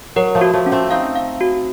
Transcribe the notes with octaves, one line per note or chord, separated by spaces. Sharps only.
F#3 A#4
F3 A3
F#4
F3 A3
C#4
A3 C4
C4 D#4 F5
F5
F#4